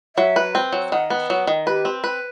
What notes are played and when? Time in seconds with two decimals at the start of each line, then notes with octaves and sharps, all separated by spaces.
0.16 F#3 E5
0.36 B4
0.55 C4
0.73 F#3
0.92 D#3 F#5
1.10 B3
1.30 F#3 F#5
1.47 D#3
1.66 G4 B4
1.85 C4
2.04 B4